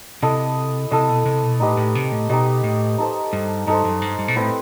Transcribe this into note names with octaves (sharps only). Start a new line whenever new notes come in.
C3 E4 A4 D#5
C3 E4 A4 D#5
B2
C3
B2
A2 D#4 G4 B4 D#5
A2
C3
A2
B2 D#4 G4 B4 D#5
A2
D#4 A4 C5
G2
G2 D#4 A4 C5
F#2
G2
G2
B2
A2 C4 E4 B4 E5